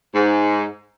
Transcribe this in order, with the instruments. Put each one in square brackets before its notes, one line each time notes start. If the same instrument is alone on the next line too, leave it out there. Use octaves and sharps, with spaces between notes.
[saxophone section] G#2